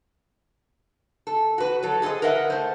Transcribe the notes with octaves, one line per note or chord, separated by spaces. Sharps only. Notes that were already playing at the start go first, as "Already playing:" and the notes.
A4
F#4 B4
F#3 A4
G#4 A4 B4 C5 D#5
A#4 B4 D#5 E5 F#5
A3 C5